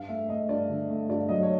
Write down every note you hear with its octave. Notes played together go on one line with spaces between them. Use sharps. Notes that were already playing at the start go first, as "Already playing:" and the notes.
Already playing: G2 F5
A3 E5
A3 D#5
G2 D5
D3
A3
G2 D5
F#3 D#5
C#5